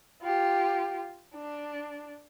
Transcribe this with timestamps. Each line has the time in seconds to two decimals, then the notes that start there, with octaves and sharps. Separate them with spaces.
0.22 F4 G4
1.35 D4